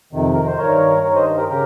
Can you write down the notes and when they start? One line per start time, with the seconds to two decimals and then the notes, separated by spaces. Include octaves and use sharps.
0.13 F2 C3 D#3
0.34 A#4
0.47 C5
0.58 G2 D#3 A#4 C#5
1.03 G2 D#3 A#4 C#5
1.15 C5 D#5
1.37 G4 A#4
1.49 C#3 G4 A#4